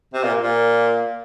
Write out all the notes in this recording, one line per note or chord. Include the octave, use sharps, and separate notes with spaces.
C3
A#2
A#2